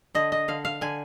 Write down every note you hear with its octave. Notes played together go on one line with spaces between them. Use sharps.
D3 D#5
D#5
D3 F5
F5
D3 G#5